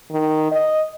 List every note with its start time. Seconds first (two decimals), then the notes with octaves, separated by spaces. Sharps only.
0.11 D#3
0.52 D#5